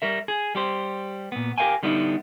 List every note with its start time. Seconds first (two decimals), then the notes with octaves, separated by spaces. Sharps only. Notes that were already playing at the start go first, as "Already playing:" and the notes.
0.02 G3 A#4 E5
0.28 G#4
0.55 G3 G4 C5
1.32 A#2 B3
1.58 G4 A#4 C#5 F5 G5 G#5
1.83 D3 G3 B3 D#4 E4